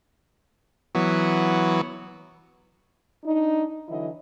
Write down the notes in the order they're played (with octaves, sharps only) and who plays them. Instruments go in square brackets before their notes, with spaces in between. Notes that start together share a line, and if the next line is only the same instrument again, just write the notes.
[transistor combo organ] E3 F#3 B3
[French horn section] D4 D#4
D3 E3 F#3 E4 D#5